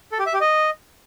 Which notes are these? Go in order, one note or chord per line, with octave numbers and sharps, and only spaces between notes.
A4
G4
E5
G4
D#5